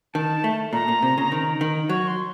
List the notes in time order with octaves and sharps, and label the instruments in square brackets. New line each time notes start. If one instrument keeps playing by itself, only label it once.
[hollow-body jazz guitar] D#3 [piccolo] A5
[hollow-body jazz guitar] A3
[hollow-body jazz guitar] A#2 [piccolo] A#5
[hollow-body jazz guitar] A#2
C3
C#3
D#3
D#3
[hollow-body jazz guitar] F#3 [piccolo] C#6
[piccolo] C6